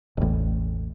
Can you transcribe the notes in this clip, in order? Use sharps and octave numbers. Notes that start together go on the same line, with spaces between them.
E1 A1